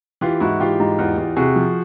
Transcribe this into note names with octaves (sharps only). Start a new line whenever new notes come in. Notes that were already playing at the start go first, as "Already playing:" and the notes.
E3 F4 G4
G#2 E4 F#4
E3 F4 G4
G#2
E2
E2
C3 F#4 G#4
F3